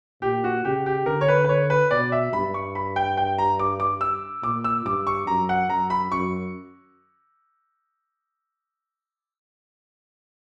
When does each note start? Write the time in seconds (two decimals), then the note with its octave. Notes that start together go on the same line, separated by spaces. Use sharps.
0.22 A#2 G4
0.44 F#4
0.65 C#3 G4
0.86 G4
1.06 D3 A#4
1.21 C#5
1.28 B4
1.44 B4
1.49 C#5
1.70 B4
1.91 B2 D5
2.12 E5
2.33 G2 B5
2.54 C#6
2.75 B5
2.96 G5
3.17 G5
3.38 A#5
3.59 D6
3.80 D6
4.01 E6
4.43 A#2 D6
4.64 E6
4.86 G2 D6
5.07 C#6
5.27 F#2 A#5
5.49 F#5
5.70 F#2 A#5
5.90 B5
6.12 F#2 C#6